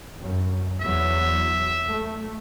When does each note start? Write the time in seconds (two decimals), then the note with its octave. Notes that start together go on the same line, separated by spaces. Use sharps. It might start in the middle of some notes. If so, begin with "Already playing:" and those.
0.19 F#2
0.81 E2 F#3 E5
1.90 A3